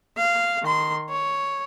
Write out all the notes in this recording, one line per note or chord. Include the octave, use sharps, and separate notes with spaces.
F5
D#3 C6
C#5